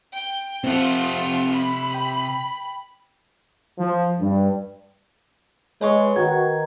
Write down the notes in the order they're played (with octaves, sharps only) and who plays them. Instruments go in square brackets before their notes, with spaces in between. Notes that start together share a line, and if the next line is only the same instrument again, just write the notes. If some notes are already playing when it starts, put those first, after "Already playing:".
[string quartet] G5
[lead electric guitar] C3 F#5 [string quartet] F3 A3 F4 [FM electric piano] C4
[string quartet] B5
[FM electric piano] G5
[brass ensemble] F3
G2
[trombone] G#3 [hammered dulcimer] B4 [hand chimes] C#5 D#5 C#6
[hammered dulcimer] D#3 [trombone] F#4 [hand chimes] G#6